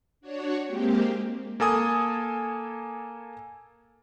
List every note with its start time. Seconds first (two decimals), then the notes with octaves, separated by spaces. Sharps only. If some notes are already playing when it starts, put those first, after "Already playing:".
0.21 D4 F#4 C#5
0.65 G#3 A#3 C4 G4
1.60 A#3 A4 G#5 D#6